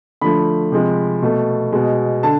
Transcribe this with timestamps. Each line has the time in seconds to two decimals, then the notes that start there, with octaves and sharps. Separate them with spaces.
0.21 D3 F3 A3 B5
0.72 C3 F3 G#3
1.22 B2 A3
1.72 B2 G#3
2.23 D3 A5